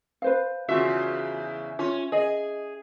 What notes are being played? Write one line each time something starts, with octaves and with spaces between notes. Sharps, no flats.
B4 C5 F5
E2 C#3 F4 F#4 E5
C#4 F4
G#4 D#5